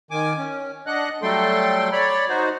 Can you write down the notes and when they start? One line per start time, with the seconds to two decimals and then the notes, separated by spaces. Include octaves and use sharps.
0.11 D#3 G#5 D6
0.38 C#4
0.86 D4 D#5 F#5 F#6
1.22 F#3 G3 A3 A4 G5 C6
1.92 C#5 D5 B5
2.29 D#4 F#4 C5